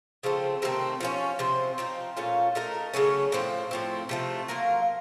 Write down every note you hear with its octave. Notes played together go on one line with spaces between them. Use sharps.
C#3 F3 A3 C4
C3 D#3 A3 C4
F3 A3 C#4
C3 F3 C4
F3 C4 D#4
A#2 A3 C#4 F4
A3 D#4 A#4
C#3 F#3 A3 C#4
A2 F3 C4
A2 F3 C4
C3 F3 A3
F#3 A#3 F4 A#4